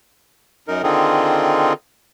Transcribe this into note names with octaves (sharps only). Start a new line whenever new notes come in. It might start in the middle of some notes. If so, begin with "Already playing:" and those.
F#2 D#4 A#4
D3 D#3 C4 D#4 F4 G#4